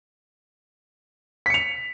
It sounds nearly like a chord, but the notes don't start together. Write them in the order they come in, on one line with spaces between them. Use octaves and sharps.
B6 C#7 F7